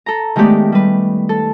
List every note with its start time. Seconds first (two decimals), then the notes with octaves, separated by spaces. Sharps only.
0.06 A4 A#5
0.36 D#3 G#3 A3 B3 G4 D5
0.72 G3 B4
1.29 A4